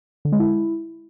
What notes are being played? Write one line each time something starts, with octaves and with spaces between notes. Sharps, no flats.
D3
G#3
E4